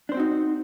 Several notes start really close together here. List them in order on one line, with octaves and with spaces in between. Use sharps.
D4 C5 C4 F#4 D#4